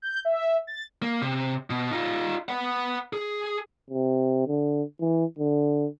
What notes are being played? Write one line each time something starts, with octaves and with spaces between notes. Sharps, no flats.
G6
E5
A6
A#3
C3
B2
D#4 F4
B4 F#5
G#4
C3
D3
E3
D3